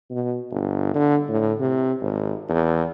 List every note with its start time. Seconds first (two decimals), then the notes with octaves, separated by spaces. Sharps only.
0.11 B2
0.51 G1
0.94 D3
1.29 A2
1.60 C3
2.01 G#1
2.49 E2